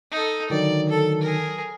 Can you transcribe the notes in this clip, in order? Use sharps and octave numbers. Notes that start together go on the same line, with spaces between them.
D#4 A4
D3 D#3 F#3 D5
A4
G#4 A#4